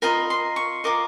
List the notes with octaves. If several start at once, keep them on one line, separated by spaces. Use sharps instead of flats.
F4 A#4 D#5 B5
C6
C#6
F4 A#4 D#5 D6